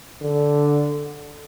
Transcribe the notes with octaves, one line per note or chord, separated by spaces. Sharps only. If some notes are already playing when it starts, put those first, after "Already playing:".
D3